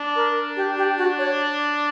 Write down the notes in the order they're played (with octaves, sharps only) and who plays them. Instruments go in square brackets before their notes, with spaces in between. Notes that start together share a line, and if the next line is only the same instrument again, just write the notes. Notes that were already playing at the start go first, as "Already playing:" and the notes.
Already playing: [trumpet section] D4
[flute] A#4
G4
G4
F#4
C#5